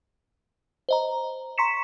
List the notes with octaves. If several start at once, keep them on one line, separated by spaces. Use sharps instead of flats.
C5 D#5 A#5
A#5 C6 C#6 B6 C#7 E7